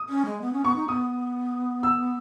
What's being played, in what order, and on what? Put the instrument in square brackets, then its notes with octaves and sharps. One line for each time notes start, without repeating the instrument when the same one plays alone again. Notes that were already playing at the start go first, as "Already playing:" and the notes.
Already playing: [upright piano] D#6
[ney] C#4
G#3
B3
C#4
[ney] B3 [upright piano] C#6
[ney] D#4
[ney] B3 [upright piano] D#6
[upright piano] E6